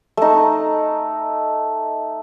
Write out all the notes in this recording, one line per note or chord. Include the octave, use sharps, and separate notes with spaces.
A3 D#4